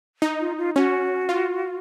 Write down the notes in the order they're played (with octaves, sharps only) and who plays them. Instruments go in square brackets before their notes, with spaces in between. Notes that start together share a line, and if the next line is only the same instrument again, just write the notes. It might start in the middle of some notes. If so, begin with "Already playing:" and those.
[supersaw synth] D#4
[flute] F4
F4
[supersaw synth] C#4 [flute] F#4
[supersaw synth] F4